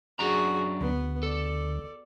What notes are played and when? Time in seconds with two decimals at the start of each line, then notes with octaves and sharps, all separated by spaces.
0.19 F#2 D4 F#4 G#4 A#5
0.81 D2 B3
1.23 A4 D5